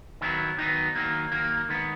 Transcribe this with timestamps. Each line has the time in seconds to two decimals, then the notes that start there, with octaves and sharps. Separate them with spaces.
0.21 D#3 F#3 B3 E4
0.58 D#3 F#3 B3 D#4
0.95 D#3 F#3 A#3
1.32 D#3 F#3 A#3
1.69 D#3 G#3 B3